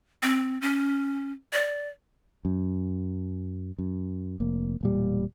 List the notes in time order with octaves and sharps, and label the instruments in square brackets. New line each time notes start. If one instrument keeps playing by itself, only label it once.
[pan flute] C4
C#4
D5
[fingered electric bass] F#2
F#2
F1 A#3
E1 A#2 G3